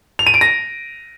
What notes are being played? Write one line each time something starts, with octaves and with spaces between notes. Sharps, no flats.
F7
D#7
D7
A#6